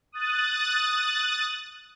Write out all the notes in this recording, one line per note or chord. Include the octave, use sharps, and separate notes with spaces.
D#6 F#6 A6